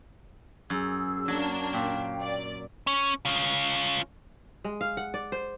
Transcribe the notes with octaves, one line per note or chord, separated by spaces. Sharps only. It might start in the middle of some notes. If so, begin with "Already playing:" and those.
F#2 G#4 E6
F#3 A#3 D4
A#2 F5 G5
D5
C#4
C#4 F4
G#3
F5
F#5
D5
C5